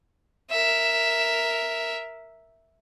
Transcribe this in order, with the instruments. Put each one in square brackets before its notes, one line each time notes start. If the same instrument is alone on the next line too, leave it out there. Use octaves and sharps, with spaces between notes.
[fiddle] A#4 E5